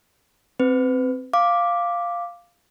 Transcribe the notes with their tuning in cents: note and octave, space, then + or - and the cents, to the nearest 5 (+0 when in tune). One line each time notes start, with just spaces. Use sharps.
C4 +0 B4 +25
F5 +0 D6 +0